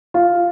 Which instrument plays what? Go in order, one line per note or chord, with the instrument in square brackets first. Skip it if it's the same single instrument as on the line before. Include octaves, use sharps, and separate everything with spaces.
[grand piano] F4